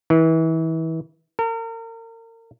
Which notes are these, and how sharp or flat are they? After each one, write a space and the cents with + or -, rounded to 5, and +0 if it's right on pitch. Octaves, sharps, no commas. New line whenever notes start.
E3 -30
A#4 -35